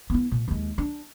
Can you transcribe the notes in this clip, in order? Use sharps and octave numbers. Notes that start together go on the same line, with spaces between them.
B3 E4
A#2
D#2 G#3
D4